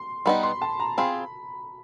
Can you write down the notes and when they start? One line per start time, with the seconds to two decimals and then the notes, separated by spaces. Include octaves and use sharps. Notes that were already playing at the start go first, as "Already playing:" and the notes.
Already playing: C6
0.26 G3 B3 D#4 B5
0.43 C6
0.62 A5
0.80 A#5
0.98 C4 F4 G#4 B5